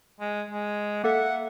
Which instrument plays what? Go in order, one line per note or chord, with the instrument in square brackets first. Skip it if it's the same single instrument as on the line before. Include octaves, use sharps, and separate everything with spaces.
[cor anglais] G#3
G#3
[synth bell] A#3 A4 E5 [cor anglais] F#5